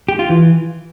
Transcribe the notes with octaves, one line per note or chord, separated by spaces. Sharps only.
G4
F4
E3